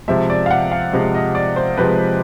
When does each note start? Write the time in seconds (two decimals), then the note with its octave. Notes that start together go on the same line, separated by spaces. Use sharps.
0.08 C3 F3 G#3 E5
0.30 D5
0.46 F5
0.51 F#5
0.71 F5
0.93 C3 F3 G#3 D#5
1.15 D#5
1.35 D5
1.56 C5
1.78 C3 F3 G#3 B4